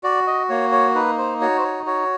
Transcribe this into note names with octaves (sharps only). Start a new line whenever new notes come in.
F#4 D5
D#5
A#3 C#5
C#5
D#4 B4
C5
F#4 C#5
C5
C#5
F#4 C#5